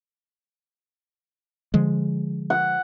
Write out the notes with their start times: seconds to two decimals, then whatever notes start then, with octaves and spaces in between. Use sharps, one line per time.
1.74 D3 F3 G#3
2.50 F#5